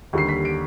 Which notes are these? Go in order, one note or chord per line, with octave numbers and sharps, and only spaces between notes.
D#2 D3 G3 C7
B6
D7